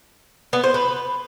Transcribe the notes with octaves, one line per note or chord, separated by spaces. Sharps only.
B3
C5
B4